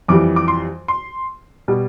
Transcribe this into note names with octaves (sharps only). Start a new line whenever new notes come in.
F2 E3 G3 D6
D6
C6
C6
B2 G3